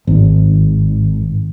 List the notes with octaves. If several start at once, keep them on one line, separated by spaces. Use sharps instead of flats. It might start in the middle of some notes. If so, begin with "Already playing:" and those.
G#1